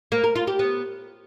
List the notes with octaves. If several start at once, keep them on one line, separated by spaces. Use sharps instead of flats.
A#3
A#4
F4
G4
B3